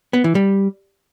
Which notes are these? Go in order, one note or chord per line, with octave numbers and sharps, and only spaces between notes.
B3
E3
G3